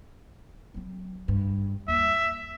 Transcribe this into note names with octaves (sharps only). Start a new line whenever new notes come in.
F#3 C4
G2
D#2 E5